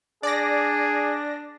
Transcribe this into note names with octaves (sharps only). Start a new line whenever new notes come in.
D4 G#4 D5 A#6